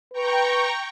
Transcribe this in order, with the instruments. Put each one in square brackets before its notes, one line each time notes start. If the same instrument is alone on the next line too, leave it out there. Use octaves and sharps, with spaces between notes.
[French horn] B4 [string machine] G5 A#5 C#6